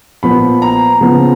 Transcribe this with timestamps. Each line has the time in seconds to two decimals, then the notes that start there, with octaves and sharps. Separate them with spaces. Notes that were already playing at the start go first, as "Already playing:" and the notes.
0.23 A#2 F3 B3 B5
0.62 A#5
1.01 C#3 F3 B3